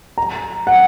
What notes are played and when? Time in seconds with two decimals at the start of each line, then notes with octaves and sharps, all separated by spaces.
0.18 A#5
0.67 F#5